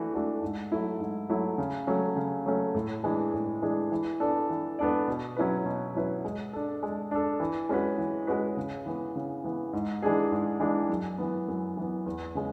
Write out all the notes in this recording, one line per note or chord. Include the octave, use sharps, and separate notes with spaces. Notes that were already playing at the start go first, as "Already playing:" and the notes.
Already playing: E3 A3 D4 F#4
A3 D4 F#4
G#2
F#3 A3 E4
G#2
F#3 A3 E4
C#3
F#3 A3 C#4
C#3
F#3 A3 C#4
A2
E3 G#3 D4 G#4
A2
E3 G#3 D4 G#4
E3
B3 D4 A4 D5
E3
B3 D4 A4 D5
B2
F#3 C#4 E4 B4
B2
F#3 C#4 E4 B4
G#3
D4 A4
G#3
D4 A4
E3
G#3 C#4 F#4 B4
E3
G#3 C#4 F#4 B4
C#3
E3 B3
C#3
E3 B3
G#2
E3 G#3 D4 G#4
G#2
E3 G#3 D4 G#4
F#2
E3 B3
F#2
E3 B3
E2
C#3 G#3